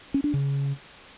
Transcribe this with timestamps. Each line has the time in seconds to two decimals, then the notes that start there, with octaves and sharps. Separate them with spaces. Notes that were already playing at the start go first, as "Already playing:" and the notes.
0.14 C#4
0.24 D4
0.34 C#3